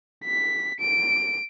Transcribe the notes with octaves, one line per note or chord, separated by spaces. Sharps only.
B6
D7